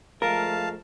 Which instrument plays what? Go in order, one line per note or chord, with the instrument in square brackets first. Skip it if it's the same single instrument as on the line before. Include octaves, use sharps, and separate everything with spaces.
[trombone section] F3 G#3 A3 [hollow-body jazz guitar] A#4 [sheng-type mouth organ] F5 A5